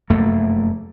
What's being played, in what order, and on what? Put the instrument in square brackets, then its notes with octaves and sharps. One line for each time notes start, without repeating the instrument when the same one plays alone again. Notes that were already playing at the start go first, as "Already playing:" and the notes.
[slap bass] F1 F#2 A3 A#3